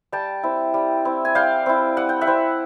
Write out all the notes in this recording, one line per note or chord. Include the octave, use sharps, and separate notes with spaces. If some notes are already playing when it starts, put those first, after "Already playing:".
G3 G5 A5
C4 E4
G3
C4 E4
G#5
G3 F5 G5
C4 E4
G3 F#5
G5
E5 F#5
C4 E4